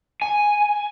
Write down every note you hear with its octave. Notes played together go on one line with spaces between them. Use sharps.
G#5